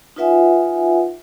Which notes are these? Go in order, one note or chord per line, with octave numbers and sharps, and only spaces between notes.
D#4 F4 B4 E5 F#5 G#5